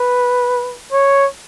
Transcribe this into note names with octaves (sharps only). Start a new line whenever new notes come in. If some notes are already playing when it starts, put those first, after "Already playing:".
Already playing: B4
C#5